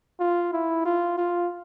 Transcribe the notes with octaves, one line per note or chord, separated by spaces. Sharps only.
F4
E4
F4
F4